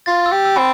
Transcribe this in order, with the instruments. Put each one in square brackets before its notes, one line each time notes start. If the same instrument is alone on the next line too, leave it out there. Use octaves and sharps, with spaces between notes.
[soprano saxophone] F4 [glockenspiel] A6
[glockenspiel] E6
[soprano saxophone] G4
[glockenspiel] E6
[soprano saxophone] C4 [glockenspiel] B5